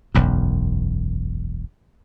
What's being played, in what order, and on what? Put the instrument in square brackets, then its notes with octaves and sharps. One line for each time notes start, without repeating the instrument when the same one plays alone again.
[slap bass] E1 B1 F#2